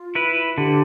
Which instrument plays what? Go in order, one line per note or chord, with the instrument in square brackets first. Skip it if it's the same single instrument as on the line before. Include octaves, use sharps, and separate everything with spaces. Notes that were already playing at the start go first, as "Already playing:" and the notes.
Already playing: [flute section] F4
[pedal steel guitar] E4 B4
[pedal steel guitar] D3 [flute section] G4